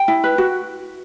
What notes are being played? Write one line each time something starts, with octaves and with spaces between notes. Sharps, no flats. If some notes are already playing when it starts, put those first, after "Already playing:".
Already playing: G5
E4
B4
F#4